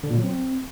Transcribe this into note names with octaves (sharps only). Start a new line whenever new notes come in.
D3
A#2
F#3
C4